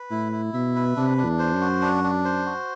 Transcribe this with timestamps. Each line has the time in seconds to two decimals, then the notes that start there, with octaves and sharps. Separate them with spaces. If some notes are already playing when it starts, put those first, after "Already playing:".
Already playing: B4
0.11 A2 E4
0.32 E4
0.54 B2 E5
0.76 B4
0.96 C3 D4
1.18 D4
1.25 E2
1.39 C5
1.54 F#2
1.61 F#4
1.82 D4
2.04 D4
2.25 C5
2.46 F#4